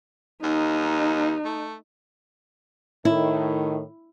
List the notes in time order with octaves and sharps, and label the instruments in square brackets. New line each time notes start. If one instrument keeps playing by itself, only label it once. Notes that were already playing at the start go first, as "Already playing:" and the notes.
[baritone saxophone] D#2 [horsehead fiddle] D#4
[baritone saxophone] A3
[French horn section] A2 D#3 [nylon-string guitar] E4